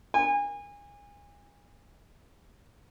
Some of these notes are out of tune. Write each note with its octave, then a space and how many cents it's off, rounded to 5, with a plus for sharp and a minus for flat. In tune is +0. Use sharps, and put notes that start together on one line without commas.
G#5 -30